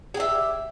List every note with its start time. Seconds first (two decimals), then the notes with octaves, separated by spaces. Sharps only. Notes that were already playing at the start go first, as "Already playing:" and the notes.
0.14 G#4
0.17 G4
0.20 E5